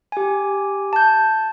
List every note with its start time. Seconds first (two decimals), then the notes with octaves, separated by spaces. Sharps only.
0.12 G4 G#5
0.93 A5 G6